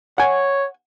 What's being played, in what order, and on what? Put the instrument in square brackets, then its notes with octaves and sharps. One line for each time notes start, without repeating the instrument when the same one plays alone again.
[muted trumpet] C#5 [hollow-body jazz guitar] F#5 G#5